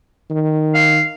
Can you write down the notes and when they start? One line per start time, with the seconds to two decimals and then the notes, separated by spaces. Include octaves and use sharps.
0.30 D#3
0.75 F5